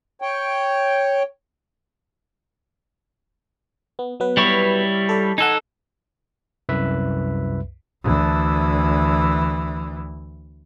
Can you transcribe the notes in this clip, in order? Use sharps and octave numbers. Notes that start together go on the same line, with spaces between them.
C#5 G5
B3
F#3 B3 B4
G3 E4 C#5
A4 D5
D#4 A4 F#5 G#5
C2 F#2 B4 E5
D2 E3